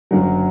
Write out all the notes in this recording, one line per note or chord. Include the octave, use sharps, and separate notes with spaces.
F#1 F#2 D3 F#3